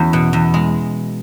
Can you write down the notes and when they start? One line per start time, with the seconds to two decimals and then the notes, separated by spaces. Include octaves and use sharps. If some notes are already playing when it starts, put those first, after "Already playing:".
Already playing: E2 F#3 C#4
0.13 B2
0.33 E2
0.54 G#3